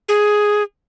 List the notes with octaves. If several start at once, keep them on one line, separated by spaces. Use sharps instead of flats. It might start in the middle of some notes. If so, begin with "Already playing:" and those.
G#4